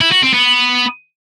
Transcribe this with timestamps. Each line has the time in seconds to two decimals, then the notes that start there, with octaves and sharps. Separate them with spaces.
0.01 E4
0.12 F#4
0.23 C4
0.34 B3